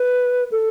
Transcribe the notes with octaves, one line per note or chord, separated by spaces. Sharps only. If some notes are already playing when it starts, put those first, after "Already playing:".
Already playing: B4
A4